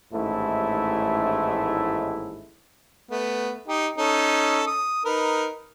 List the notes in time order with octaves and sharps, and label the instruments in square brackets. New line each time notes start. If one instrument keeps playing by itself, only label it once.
[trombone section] A1 D#2 G#2 A3 E4
[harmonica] A3 B3
D#4 G4
C#4 D#4 A4
D#6
D#4 A#4 B4